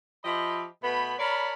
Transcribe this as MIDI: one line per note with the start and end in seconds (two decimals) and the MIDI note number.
0.24 0.64 53
0.24 0.64 67
0.24 0.64 75
0.24 0.64 76
0.24 0.64 83
0.82 1.14 47
0.82 1.14 57
0.82 1.14 59
0.82 1.14 83
1.18 1.53 70
1.18 1.53 73
1.18 1.53 74
1.18 1.53 81
1.18 1.53 83